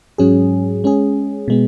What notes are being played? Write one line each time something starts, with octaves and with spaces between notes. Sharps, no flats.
G#2 F#3 C#4 G#4
G#3 C#4 G#4
B2 G#3 B3